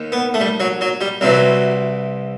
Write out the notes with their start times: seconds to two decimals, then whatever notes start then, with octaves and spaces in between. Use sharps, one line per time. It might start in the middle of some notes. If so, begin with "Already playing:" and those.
Already playing: D#2 D#3
0.12 B3
0.34 A3
0.40 G3
0.60 F#3
0.81 F#3
1.01 G3
1.21 C2 C3 E3 F#3